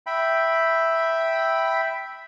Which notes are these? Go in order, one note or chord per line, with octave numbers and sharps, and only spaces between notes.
E5 G5 B5